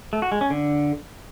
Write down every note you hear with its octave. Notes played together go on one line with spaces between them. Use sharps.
A3
F#4
G#3
C#4
D3